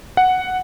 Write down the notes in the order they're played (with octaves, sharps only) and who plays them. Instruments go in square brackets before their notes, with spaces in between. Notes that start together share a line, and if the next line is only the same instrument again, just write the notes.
[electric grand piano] F#5